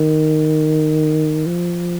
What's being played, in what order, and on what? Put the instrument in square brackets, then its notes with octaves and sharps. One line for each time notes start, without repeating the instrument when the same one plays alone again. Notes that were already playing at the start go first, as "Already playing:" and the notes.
Already playing: [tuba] D#3
F3